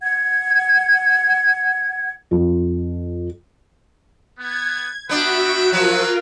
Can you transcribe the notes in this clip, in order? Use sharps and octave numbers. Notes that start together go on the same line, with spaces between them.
F#5 G#6
F2
B3 G#6
B3 D4 F#4 B4 E5 F#5 G5
F3 F#3 F4 F#4 G#4 A#4 B4